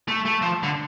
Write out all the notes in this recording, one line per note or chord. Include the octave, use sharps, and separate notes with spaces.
A3
A3
F3
D3